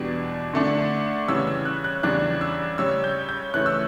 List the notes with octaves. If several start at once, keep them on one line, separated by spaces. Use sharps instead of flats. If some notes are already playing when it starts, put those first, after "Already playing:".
Already playing: E2 B2 G3 D4
D3 A3 D4
C#3 E3 G3 C#4 E6
E6
F#6
F#6
E2 C#3 G3 D4 F#6
E6
C#3 G3 C#4 E6
G6
G6
C#3 E3 A3 C#4 F#6
E6